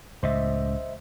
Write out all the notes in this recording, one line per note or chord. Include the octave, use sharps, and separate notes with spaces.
C#2 A2 C5 D#5 E5